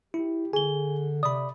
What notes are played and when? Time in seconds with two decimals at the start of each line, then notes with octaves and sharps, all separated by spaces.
0.14 E4 G4
0.53 D3 G#4 G#5 G7
1.23 C3 D5 B5 D#6